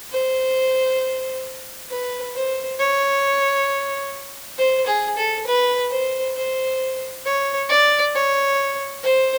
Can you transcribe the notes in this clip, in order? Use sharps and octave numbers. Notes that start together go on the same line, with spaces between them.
C5
B4
C5
C#5
C5
G#4
A4
B4
C5
C5
C#5
D5
C#5
C5